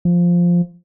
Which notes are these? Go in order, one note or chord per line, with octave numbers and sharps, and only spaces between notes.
F3